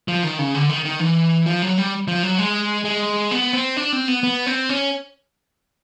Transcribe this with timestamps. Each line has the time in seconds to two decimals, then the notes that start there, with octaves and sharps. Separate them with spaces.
0.08 F3
0.23 D#3
0.39 C#3
0.55 D3
0.69 D#3
0.85 D#3
1.00 E3
1.46 F3
1.62 F#3
1.78 G3
2.08 F3
2.23 F#3
2.38 G#3
2.85 G#3
3.31 B3
3.53 C4
3.77 D4
3.92 C4
4.08 B3
4.23 B3
4.46 C4
4.69 C#4